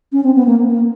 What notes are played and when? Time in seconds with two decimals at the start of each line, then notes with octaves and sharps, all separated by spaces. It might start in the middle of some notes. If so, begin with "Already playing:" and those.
0.12 C#4
0.23 C4
0.35 B3
0.47 A#3
0.69 A#3